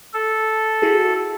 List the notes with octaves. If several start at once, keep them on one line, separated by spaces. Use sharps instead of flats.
A4
E4 F#4 G#4